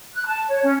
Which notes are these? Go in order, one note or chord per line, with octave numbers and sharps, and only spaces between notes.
F#6
A5
C#5
C#4